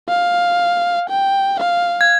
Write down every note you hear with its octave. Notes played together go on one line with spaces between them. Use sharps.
F5
G5
F5
G#6